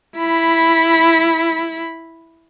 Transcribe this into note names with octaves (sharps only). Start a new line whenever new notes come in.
E4 B5